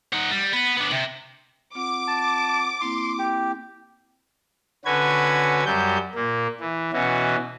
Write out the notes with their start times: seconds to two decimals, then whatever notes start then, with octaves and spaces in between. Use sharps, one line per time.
0.13 D#4 F#5
0.31 G3
0.53 B3
0.77 B3 D4
0.93 C3
1.75 C4 F4 F#5 D6
2.08 A5
2.81 A#3 C4 E4 C6
3.18 G4
4.85 D3 C#4 F#4 B4 G#6
5.66 F#2 F#3 G3 G6
6.15 A#2 A#3
6.60 E3
6.93 B2 E3 C#4 F#4